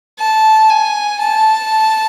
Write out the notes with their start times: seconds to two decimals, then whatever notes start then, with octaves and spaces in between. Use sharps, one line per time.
0.19 A5
0.69 G#5
1.20 A5